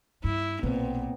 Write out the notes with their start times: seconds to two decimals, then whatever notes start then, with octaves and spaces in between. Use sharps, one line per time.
0.24 G2 E4
0.63 B1 A#2 B3 C4